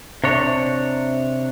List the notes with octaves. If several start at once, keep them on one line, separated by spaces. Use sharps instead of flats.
C3 D4 C#5